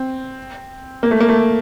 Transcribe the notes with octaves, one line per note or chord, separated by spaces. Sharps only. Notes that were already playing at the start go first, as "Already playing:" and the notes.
Already playing: C4
A#3
A3
A#3
A3